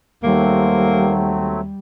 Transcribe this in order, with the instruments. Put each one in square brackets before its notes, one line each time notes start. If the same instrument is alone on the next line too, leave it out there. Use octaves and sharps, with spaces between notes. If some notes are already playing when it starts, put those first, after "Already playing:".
[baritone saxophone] D#2 [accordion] F#3 A3 C4 [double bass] G3 [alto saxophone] A#3